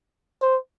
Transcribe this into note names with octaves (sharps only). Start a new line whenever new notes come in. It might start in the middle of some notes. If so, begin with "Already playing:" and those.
C5